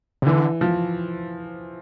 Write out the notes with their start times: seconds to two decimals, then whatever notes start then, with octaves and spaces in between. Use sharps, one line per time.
0.22 C3
0.26 D3 E3
0.61 F3